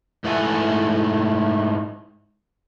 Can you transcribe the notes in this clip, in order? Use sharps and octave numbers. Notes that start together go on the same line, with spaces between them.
G#2 A3 E4 A4 F#5 G#5